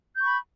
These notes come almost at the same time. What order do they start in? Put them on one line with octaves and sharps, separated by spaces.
G6 C#6 B5